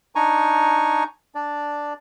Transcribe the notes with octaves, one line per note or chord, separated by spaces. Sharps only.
D4 D#4 G#5 A#5 C#6
D4 D5